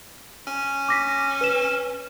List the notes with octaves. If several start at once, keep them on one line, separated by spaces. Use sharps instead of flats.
C#4
D6 A#6 B6
B4 E7